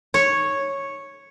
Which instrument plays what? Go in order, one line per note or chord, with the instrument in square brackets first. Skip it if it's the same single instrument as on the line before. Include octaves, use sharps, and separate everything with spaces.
[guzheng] C#5